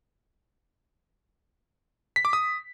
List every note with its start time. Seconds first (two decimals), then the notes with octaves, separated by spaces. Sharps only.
2.16 B6
2.25 D6
2.33 D#6